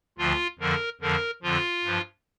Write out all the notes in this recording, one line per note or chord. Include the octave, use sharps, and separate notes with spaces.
D2 D3 F3 F4
F2 D3 F3 A#4
F2 D3 F3 A#4
F2 D3 F3 F4
G2 F3